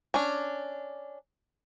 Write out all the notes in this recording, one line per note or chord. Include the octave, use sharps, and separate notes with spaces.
C#4 D4